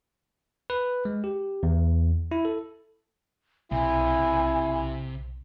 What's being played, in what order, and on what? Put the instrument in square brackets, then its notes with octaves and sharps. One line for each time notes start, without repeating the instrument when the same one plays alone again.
[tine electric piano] B4
G#3
G4
E2
E4
A4
[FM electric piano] B1 [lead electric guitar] C3 [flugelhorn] E4 [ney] G#5